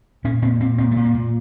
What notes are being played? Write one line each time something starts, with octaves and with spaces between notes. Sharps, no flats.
A#2 C#4
A#2 C4
A#2 C4
A#2 C4
A3
A#2
A#3
A#2